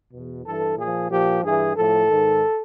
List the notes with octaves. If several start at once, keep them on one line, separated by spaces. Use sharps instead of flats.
E2 B2
G2 E3 A4
A#2 F3 G#4
A#2 F3 G4
G2 E3 G#4
A2 F3 A4
G#2 D#3